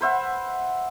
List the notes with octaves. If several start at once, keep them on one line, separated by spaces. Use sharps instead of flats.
B4 C5 E5 F#5